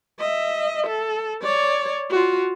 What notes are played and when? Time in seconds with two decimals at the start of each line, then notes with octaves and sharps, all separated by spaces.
0.19 D#5 E5
0.87 A4
1.42 C#5 D5
2.10 F4 F#4